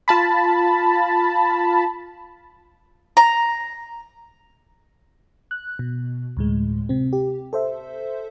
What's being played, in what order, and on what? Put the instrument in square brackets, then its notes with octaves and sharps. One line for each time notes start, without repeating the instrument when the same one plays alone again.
[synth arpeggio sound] F4 A5 B5
[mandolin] A#5
[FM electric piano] F#6
B2
D2 A2 G#3
C3 C4
G4
A4 C5 E5